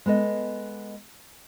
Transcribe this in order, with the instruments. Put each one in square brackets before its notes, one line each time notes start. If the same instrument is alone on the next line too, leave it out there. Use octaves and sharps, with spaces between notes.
[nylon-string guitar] G#3 B3 A4 D#5